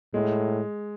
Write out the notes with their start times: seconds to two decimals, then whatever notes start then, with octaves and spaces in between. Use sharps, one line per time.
0.14 A2 G#3